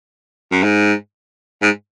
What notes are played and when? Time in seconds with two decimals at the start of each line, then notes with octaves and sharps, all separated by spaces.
0.52 F#2
0.63 G#2
1.62 G#2